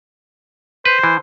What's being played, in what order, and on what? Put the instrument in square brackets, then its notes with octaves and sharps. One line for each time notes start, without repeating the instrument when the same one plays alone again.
[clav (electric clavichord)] B4 [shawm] C5
[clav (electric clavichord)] E3